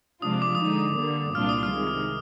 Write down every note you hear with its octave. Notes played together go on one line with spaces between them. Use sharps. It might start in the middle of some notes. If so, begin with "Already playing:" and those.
C3 F3 G#3 D4 F4 D#6
D6
D#6
D3 G#3 D#4 D6
D3 G3 A#3
C2 A#2 G3 D4 F4 F6
D#6
F6
C3 D#3 G#3